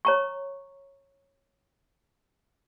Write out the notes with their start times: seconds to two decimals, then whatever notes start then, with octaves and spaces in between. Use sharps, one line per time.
0.05 C#5 A#5 C#6